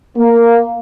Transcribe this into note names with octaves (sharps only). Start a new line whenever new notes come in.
A#3